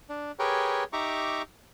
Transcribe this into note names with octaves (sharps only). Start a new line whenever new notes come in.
D4
G4 G#4 A#4 B4 C#5 G5
D#4 G4 E5 A#5 C#6 D6